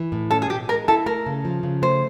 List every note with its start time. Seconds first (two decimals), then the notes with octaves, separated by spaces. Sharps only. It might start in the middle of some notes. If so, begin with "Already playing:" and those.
Already playing: E3
0.12 A2
0.31 C#4 A4
0.42 G#4
0.50 B2 G4
0.69 G#3 A#4
0.88 E4 A4
1.06 A3 A#4
1.26 C#3
1.45 F3
1.63 C#3
1.82 A3 C5